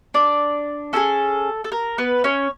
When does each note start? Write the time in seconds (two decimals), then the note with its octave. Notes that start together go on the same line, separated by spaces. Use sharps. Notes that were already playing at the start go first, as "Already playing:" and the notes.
0.14 D4 D5
0.93 C#4 E4 G#4 A4
1.64 A4
1.72 A#4
1.98 B3 B4
2.24 C#4 C#5